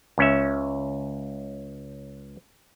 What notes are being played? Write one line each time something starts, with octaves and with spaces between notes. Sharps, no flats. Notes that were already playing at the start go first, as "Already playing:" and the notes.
C#2 C#4 E5